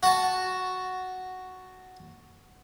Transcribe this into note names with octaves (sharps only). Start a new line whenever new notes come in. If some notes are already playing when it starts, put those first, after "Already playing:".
F#4 A5